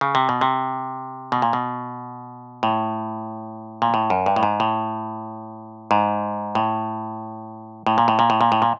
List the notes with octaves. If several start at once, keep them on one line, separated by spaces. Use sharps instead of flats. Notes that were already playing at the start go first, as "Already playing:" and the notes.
C#3
C3
B2
C3
B2
A#2
B2
A2
A#2
A2
F#2
G2
A2
G#2
A2
G#2
A2
A2
A#2
A2
A#2
A2
A#2
A2
A#2